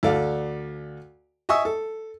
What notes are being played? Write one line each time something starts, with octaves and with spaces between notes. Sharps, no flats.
D2 A4 D5 F5
D#5 E5 G#5 C#6 D#6 E6
A4